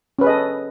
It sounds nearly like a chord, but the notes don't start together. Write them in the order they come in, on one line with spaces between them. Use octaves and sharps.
C#4 B4 G#4 D#5 A4